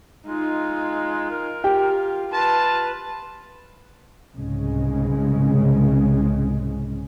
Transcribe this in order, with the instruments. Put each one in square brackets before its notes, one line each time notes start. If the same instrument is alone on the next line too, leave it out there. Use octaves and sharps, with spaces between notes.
[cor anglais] G#3 [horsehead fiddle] D#4 F4
[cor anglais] A#4
[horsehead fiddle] F4 [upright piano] G4 G5
[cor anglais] F4 [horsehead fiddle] B4 [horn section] A5
[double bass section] C2 G#2 C#3 G#3